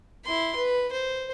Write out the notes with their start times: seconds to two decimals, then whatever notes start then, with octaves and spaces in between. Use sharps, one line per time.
0.25 E4 C6
0.56 B4
0.92 C5